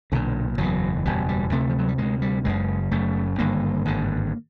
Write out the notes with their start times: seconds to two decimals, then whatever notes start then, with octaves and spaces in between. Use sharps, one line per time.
0.12 B1 A#2 D3
0.58 F#1 E2 B2 F#3
1.05 F#1 E2 B2 G3
1.29 G3
1.52 D2 C3 A3
1.69 F3
1.79 F#3
1.88 G3
1.98 D2 C3 G#3
2.22 G3
2.45 F#1 F#2 C#3 G#3
2.91 F#1 F#2 C#3 A3
3.38 G#1 G2 D3 A#3
3.85 G#1 G2 D3